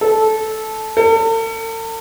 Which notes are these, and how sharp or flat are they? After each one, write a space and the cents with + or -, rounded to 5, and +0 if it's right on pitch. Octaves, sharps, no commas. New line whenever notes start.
A4 -10
A4 +45